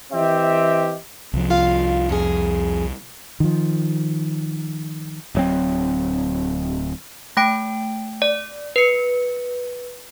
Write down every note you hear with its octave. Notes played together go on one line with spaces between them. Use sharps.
E3 C4 G4 D#5 E5
C2 F3
F4 F5
F2 G#4
D#3 F3
D1 F#3 C4
A3 G5 D7
D5
B4 C#7